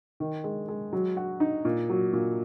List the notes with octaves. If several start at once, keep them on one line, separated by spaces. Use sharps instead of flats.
D#3
G#3
G#3
F#3
F#4
D#4
A#2
F#3
A#2